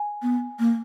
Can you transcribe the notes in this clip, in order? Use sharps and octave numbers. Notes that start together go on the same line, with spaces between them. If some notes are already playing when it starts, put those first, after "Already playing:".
Already playing: G#5
B3
A#3